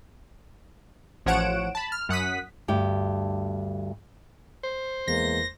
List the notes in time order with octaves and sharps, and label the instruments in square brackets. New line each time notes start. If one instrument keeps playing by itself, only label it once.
[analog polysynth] A1 F3 C#5 F#5 D7 E7
A5 B5
F6
F#2 F#5 D#6 B6
[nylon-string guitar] D2 G2 G4
[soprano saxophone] C5
[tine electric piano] E2 [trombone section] E3 G#3 A#3 [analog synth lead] A#6